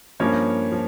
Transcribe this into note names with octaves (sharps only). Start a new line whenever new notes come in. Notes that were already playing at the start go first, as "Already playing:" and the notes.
G2 F3 A#3 C#4 C#5
F3